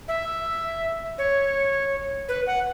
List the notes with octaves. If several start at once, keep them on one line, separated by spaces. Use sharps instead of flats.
E5
C#5
B4
F#5